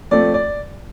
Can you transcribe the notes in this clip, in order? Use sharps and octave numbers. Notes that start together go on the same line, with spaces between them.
F3 A3 C4 D5
D5